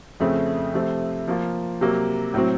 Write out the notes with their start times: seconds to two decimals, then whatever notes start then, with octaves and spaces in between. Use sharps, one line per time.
0.20 F2 C#3 A3 C4
0.74 C3 F3 A3 C4
1.28 F3 A#3 F4
1.81 C3 F#3 A#3
2.34 A2 F#3 C4